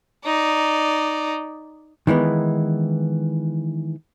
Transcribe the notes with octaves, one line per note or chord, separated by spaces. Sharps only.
D#4 D5
D#3 E3 G#3 B3